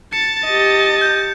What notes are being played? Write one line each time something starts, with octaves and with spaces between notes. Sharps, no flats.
A5 A6 C#7
G4 D#5
G6